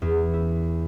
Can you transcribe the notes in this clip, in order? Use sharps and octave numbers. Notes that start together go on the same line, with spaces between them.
E2
E4